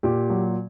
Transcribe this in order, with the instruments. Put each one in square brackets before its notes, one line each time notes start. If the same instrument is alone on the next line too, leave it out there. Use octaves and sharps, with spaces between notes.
[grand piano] A#2 G4
F#3